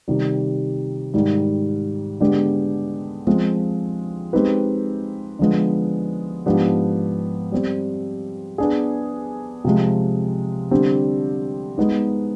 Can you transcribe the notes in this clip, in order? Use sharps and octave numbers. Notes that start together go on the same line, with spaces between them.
C3 D#3 G3
G#2 D#3 G3
D3 G#3 B3 D4 G4
F3 G#3 C4 F4
G#3 C4 D#4 G4 B4
D3 F3 G#3 B3
G#2 F3 B3 D4 G4
G3 C4 G4
B3 D4 G#4
C3 F3 G#3
D3 G3 C4 G4
G#3 B3 D#4